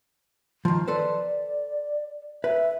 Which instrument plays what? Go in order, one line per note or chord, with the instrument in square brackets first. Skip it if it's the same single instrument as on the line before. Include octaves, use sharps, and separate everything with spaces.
[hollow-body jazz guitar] D#3 F3
[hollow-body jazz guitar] A4 B4 C5 [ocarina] D5
[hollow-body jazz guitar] B4 [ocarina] E5